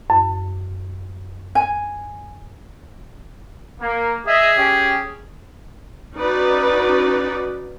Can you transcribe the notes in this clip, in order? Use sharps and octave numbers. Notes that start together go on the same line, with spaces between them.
F#2
G#5
A#3
G#4 D#5 E5
C#4 G4
C#4 D#4 F#4 B4 D5